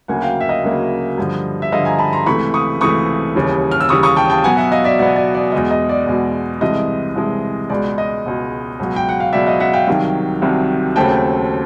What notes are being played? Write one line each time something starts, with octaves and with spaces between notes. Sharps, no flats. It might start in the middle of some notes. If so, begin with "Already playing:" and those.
D2 C#3 F#3 A#3 F#5 G#5
F5 G5
E5
D#5 F5
D2 C#3 F#3 A#3
G2 D3 F3
E5
G2 D3 F3 D#5 F5
G#5 A#5
A5 B5
A#5 C6
C#2 C3 E3 A3 B5 C#6
C#6 D#6
C#2 C3 E3 A3 C#6 D#6
D#2 C#3 E3 G3
F6
E6
D#2 C#3 E3 G3 C#6 D#6
C#6 D#6
G5 A5
G5 A5
B2 F#3 B3 F#5 G#5
E5 F#5
D#5 F5
D5 E5
B2 F#3 B3 D5
D5
D5
E2 B2 G#3 D#5
D#5
D5
E2 B2 G#3
C2 C3 E3 G#3 D#5
C2 C3 E3 G#3
C#2 B2 G#3 D5
D#5
C#2 B2 G#3
C#2 B2 F#3
G5
F#5
F5
C#2 B2 F#3 D5 E5
D#5 F5
E5 F#5
F5 G5
C2 C3 D#3 F#3
C2 C3 D#3 F#3
D#2 C#3 F#3 A3 C4 G5 A5